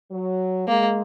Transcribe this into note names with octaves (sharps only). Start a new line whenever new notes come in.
F#3
G#3 A#3